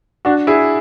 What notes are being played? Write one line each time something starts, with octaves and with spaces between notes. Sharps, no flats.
D4 F#4
E4 G#4